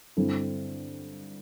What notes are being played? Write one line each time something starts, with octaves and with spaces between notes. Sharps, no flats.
G2 D3 C4 E4 A4